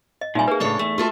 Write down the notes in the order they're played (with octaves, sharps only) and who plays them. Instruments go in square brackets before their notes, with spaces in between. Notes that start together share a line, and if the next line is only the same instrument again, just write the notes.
[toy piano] D#5
[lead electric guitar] A#2 G3 [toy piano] D#4 E5 G#5
[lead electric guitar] A#3 [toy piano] G#4 B4
[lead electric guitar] A2 C#3 [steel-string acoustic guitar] D4 A4 C#5
[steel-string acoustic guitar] E2 [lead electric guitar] A3
[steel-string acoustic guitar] F4 A4 E5 [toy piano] F#4 A5